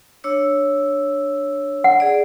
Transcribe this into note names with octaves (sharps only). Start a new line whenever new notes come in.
D4 C#5 E6
F#5
G#4 D5